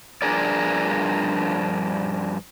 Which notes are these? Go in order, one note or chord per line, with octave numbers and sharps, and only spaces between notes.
G2 F3 D4 G#4 A#4 D5